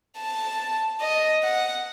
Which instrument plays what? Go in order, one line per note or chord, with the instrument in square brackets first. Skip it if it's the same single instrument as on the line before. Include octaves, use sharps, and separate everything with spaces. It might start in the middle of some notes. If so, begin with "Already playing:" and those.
[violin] A5
D#5
F#5